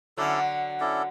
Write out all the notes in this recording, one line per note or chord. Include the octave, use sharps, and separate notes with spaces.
D3 F#3 C#4 E4 A4 D5
C#4 E4 A4 D5